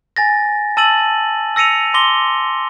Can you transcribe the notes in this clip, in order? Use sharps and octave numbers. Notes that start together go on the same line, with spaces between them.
G#5 A6 A#6
A5 E6 A6 D#7 F#7
E6 A#6 C#7 D#7 F7
C6 D6 A#6 G7